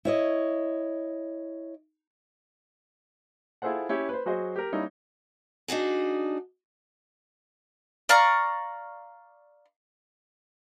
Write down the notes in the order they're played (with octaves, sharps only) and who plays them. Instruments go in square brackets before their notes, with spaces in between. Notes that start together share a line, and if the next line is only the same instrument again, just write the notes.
[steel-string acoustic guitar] E4 C#5 D#5
[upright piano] E4 F4 G#4 A4 C5 F#5
C#4 E4 G4
B4 C5
F#3 F#4 G#4 C5 D#5
G4 A#4
G3 A#3 C#4 D#4 E4
[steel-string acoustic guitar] D4 D#4 F#4 G#4
[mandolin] D5 F5 A#5 C#6